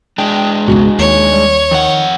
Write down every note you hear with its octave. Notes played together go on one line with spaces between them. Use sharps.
G#3 D4 G5
C#2 G#2 B2 F#4
D#2 C#5
G3
F2 D#3 F#5